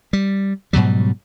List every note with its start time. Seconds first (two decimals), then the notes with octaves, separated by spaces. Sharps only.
0.13 G3
0.73 G#2 B2 F#3 G3